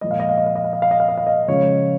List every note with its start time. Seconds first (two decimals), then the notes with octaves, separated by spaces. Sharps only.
0.01 A#2 F3 G#3 D#5
0.11 F5
0.20 D#5
0.29 F5
0.38 D#5
0.46 F5
0.56 D#5
0.64 F5
0.73 D#5
0.82 F5
0.91 D#5
1.00 F5
1.09 D#5
1.18 F5
1.27 D#5
1.48 C#3 F3 G#3 C#5